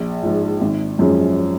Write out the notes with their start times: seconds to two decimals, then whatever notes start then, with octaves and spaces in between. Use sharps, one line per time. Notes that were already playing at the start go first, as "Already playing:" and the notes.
Already playing: A#1
0.23 G#2 F3
0.61 G#1
0.99 F#2 F3 G#3 C#4